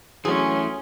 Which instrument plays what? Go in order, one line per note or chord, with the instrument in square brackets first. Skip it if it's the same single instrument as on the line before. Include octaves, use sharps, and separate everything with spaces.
[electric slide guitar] E3 A3 [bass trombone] F#3 [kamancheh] C#4 C6 [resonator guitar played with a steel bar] G#4